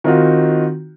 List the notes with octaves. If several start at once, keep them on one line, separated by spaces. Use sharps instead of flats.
D#3 C4 D#4 F4 F#4